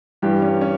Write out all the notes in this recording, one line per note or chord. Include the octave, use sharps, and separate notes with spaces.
G2 E3 G3 G4
C#4
C#4